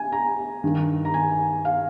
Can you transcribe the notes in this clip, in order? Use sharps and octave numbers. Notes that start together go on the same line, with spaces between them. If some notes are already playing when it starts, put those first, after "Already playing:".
Already playing: G#5
A#5
G2 D#3
A#5
G#5
F5